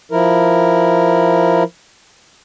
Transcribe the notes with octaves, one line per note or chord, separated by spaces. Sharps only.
F3 E4 A#4